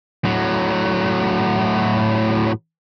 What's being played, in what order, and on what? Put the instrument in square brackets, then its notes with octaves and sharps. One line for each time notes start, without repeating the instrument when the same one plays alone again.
[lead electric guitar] A2 F#3